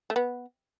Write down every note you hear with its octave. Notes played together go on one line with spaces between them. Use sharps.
A3
B3